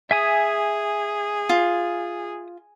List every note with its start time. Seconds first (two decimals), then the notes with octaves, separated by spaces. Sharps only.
0.11 G#4 E5 G#5 D#6
1.49 F4